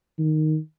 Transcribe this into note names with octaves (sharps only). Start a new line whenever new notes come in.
D#3